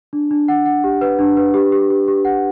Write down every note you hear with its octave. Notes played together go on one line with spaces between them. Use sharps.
D4
D4
F#5
F#5
G4
B4
D4
B4
G4
G4
G4
G4
F#5